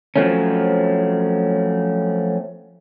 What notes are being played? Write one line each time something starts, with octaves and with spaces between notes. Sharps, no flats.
F3 F#3 A3 C4 C#4